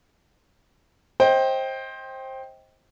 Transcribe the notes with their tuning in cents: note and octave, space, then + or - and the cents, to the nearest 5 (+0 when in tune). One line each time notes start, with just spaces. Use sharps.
C5 +20 D#5 +25 G5 +0